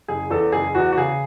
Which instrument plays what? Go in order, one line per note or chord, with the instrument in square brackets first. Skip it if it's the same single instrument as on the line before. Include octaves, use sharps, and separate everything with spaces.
[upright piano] F#1 G#4
E2 A4
F#1 G#4
E2 F#4
F#4
C#3 G#4